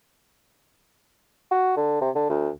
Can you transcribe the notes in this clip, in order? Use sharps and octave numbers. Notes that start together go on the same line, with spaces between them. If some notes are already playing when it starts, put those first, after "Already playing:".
F#4
D3
C3
D3
D2